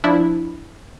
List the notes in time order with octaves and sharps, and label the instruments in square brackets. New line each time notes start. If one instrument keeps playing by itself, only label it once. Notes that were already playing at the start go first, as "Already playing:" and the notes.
[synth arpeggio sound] F3 D4 E4